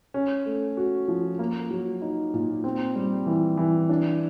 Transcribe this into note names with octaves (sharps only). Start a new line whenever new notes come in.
C#4
A3
F#4
F3
A#3
F#3
D#4
A#2
C4
G3
E3
E3
D4